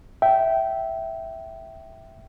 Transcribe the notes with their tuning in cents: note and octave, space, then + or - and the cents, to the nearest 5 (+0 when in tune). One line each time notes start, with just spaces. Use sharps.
E5 +0 G5 -20